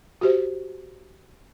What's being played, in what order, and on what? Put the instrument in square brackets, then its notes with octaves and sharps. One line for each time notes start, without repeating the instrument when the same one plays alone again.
[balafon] F#4 G4 C5